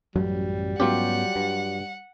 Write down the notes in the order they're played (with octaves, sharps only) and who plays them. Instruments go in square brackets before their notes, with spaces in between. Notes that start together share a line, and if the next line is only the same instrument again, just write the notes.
[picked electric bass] A1 F#2 F#3 [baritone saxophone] G3
[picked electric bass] G#2 B3 C#4 [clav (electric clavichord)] F#3 F4 G4 [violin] F#5
[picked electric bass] G2